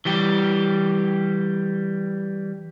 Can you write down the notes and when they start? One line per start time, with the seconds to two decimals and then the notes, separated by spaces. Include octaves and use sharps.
0.05 E3 G3 G4